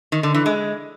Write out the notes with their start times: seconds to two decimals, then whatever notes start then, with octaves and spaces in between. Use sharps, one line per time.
0.12 D#3
0.23 D3
0.34 E3
0.46 G#3